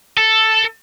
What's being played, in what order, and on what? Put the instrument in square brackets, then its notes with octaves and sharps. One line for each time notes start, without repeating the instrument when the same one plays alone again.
[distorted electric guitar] A4